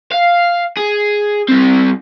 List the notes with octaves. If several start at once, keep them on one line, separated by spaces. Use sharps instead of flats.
F5
G#4
G3 C4